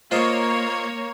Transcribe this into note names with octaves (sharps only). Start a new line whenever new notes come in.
A#3 F4 C5 C#5 D#5